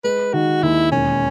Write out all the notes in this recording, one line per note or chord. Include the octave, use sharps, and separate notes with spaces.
G#3 B4
D#3 F#4
D#2 E4
E1 C#4